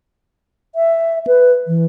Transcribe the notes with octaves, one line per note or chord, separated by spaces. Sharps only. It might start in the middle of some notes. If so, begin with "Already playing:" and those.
E5
B4
E3